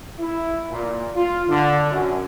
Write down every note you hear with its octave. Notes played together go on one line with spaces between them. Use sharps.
E4
A#2
F4
D3
F#2